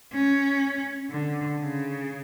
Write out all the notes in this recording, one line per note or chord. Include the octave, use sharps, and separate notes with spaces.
C#4
D3
C#3